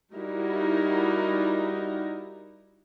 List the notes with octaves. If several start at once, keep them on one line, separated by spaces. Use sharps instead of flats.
G3 D#4 E4 F#4 A#4